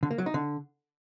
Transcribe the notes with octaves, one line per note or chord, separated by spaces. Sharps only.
D3
A#3
F#3
D#4
D3